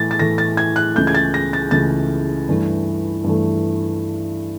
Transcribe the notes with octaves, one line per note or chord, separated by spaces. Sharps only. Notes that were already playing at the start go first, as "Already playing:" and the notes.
Already playing: A2 E3 A3 A6
A6
A2 E3 A3 A#6
A6
G#6
F#6
C#2 C#3 E3 A3 G6
G#6
A6
A#6
A6
C#2 C#3 E3 A3 A6
G2 E3 A3
G2 E3 A3